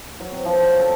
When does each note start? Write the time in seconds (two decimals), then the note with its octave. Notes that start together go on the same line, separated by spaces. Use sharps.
0.20 F#3
0.32 C4
0.45 F3
0.61 F#3
0.79 A4